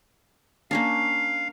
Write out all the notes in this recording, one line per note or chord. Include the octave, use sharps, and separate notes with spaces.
A#3 C#4 D4 F5